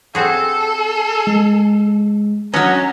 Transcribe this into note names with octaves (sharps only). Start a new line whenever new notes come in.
C4 F#4 G#4 A4
G#3
F#3 C#4 D#5 F#5 A#5